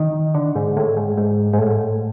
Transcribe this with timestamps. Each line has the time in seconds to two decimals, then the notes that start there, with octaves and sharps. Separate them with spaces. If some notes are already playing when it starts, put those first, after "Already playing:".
Already playing: D#3
0.35 D3
0.55 G#2
0.77 A2
0.97 G#2
1.18 G#2
1.53 G#2
1.58 A2